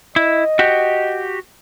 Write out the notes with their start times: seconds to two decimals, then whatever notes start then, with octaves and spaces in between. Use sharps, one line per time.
0.16 E4 D#5
0.59 F#4 G4